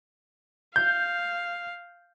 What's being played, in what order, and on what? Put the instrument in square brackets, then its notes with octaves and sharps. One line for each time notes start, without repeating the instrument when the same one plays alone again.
[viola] F5 [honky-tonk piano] G6